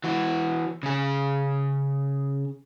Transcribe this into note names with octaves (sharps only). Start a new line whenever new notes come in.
E3 F#4
C#3 G#4